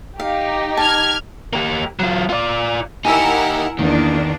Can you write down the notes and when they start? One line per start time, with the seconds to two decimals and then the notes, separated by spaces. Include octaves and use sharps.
0.20 D#4 G4 F5
0.77 A5 F6 G#6
1.53 A#3 G4
1.99 F#3 F4
2.30 F4 D5
3.05 D#4 E4 G4 A#4 F#5 G#5 E6
3.79 E2 D#3 A#3 D4